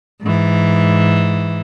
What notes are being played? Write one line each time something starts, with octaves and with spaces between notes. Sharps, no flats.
G#2 E3